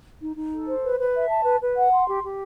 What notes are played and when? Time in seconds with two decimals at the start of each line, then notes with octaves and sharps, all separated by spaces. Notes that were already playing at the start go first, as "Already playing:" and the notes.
0.20 D#4
0.36 D#4
0.51 A4
0.67 C5
0.83 B4
0.98 B4
1.14 E5
1.29 A5
1.45 B4
1.61 B4
1.76 F#5
1.91 C6
2.08 G4
2.23 G4